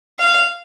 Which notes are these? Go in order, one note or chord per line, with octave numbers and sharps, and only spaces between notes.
F5